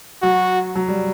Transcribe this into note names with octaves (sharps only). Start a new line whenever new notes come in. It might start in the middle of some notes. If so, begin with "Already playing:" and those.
F#3 F#4
F#3
G3